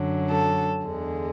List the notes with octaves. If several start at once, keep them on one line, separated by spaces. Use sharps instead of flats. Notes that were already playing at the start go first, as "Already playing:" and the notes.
Already playing: F#2 D3 F#3
A4
E2 D3 G#3